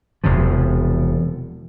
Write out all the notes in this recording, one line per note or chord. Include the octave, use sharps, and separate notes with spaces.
E1 E2 C3 F3